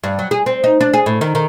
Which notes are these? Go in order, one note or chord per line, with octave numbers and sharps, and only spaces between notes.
G2
F#3
G#4
C4
D#4
D4
G#4
A2
D#3
D#3